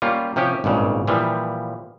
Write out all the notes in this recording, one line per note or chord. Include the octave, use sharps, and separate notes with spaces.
G3 A#3 C#4 F4
C3 F3 C#4 G4
G#1 G2 A#2 C#3
A#2 E3 F3 G3